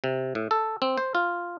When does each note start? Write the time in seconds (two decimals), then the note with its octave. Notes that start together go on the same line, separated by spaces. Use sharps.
0.04 C3
0.35 A2
0.51 A4
0.82 C4
0.98 C5
1.15 F4